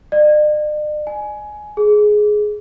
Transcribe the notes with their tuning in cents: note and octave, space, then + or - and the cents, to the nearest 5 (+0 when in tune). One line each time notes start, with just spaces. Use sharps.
D5 +45
G#5 +15
G#4 +15